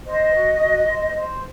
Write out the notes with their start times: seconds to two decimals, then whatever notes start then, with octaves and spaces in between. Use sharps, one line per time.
0.05 C5 D#5
0.33 F#4
0.60 F#4
0.87 C5
1.15 C5